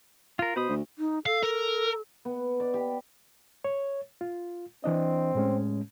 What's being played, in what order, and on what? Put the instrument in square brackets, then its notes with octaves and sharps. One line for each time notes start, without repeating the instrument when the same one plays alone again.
[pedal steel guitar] F4 A#4
[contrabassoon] B2 [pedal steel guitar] C5 B5 D#6
[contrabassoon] D2
[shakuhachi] D#4
[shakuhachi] A4 [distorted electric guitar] F5
[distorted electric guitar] A#4
[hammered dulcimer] B3
D5
G4
[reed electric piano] C#5
F4
[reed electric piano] E3 D4 D#5 [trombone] C4
[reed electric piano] A2 G#3 C#4